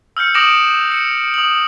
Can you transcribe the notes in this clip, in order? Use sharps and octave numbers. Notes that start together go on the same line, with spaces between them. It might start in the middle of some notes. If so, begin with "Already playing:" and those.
E6 F6 G6 C#7
D6 D#6 A#6 D7 E7 F#7
C#7
D#6 F#7